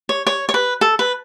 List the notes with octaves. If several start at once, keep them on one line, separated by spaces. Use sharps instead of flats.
C#5
C#5
C#5
B4
A4
B4